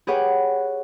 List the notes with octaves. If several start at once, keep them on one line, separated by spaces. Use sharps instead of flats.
G4 G#4 B4 C#5 F#5 G5